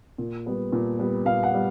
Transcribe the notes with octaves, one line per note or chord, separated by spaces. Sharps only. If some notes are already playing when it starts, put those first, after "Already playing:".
A#2
G3 B3
A#2
G3 B3
A#2 F5
F#5
G3 B3